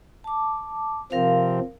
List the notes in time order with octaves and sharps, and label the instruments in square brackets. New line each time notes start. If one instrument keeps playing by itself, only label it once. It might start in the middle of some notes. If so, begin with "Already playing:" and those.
[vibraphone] A5 D6
[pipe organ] C3 F3 C4 [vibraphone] A#4 F5